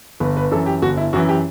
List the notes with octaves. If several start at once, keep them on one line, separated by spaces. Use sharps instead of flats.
G1 B4
B4
F#2 E3 A4
G4
G1 F#4
E4
F#2 E3 F#4
G4